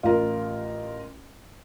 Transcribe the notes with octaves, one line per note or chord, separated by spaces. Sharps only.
A1 F4 A#4